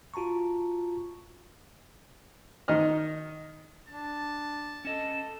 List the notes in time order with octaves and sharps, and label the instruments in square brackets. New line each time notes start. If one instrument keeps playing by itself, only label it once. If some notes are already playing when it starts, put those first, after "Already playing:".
[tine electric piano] F4 F#4 A5 A#5 C#6
[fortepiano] D#3 D#4 D#5 F6
[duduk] D4 [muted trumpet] A5
[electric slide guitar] C#4 D#5 [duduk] A4 [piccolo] E7